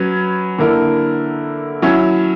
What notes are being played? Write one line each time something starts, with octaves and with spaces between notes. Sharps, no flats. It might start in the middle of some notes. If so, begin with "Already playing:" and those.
Already playing: F#3 C#4 B4
D3 A#3 E4 A#4
F#3 C#4 E4